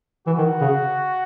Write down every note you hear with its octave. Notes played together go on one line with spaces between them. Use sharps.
E3 F#4
D#3
C#3